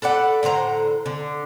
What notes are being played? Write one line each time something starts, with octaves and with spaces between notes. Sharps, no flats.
A4 B4 D5 F#5
A2 D3 C5 A#5
D3